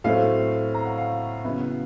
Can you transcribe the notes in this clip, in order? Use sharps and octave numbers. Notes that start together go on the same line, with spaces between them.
A2 F#3 A3 C4 F5
A#5
F#5
F5
C#3 F#3 B3 E4